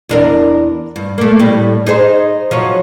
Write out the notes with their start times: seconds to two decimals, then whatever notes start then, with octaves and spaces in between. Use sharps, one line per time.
0.09 E2 D4 A#4
0.96 G2
1.18 A3 A#3
1.39 A2 G3
1.87 D#4 G#4 C5
2.51 F3 F#3 C#5